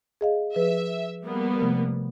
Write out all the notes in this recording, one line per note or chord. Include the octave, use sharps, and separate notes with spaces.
G#4 D#5 F5
F3 G#4 B4 E5
G3 A#3 B3
C3 F3 A3